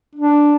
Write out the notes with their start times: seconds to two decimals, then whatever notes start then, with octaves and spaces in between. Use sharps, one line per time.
0.15 D4